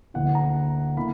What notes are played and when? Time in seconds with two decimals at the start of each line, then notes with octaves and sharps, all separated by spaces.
0.14 D2 D3 A#3 E4 F#5
0.35 A#5
0.97 D3 A#3 E4 B5